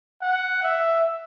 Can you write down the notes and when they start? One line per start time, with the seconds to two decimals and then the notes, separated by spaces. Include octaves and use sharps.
0.22 F#5
0.63 E5